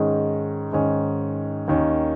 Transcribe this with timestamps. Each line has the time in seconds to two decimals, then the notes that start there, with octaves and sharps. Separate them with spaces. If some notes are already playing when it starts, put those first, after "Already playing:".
Already playing: G#2 D#3 G#3 C#4
0.73 G#2 D#3 C#4
1.68 D#2 D#3 C#4